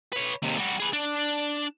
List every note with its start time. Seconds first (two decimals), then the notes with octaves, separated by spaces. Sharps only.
0.13 B4 C#5
0.42 D#2 C3
0.57 G3 F#4
0.80 G#4 B4
0.93 D4